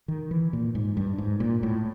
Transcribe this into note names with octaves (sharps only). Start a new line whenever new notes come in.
D#3
E3
A#2
G#2
G2
G#2
A#2
A2